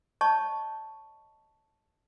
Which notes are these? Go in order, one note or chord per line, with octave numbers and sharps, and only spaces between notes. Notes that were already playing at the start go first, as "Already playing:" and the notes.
C#5 D#5 A5 C#6